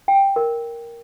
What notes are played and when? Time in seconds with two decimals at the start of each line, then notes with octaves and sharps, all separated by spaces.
0.08 G5
0.36 A#4